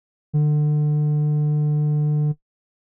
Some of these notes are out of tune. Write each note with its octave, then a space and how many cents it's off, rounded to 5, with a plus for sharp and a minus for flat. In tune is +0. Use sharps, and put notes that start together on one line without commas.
D3 +30